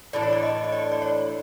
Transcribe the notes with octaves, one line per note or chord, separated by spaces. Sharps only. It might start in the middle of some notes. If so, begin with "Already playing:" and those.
A2 E3 A3 D4 D5
C#5
D5
D#5
D#5
D5
D5
C#5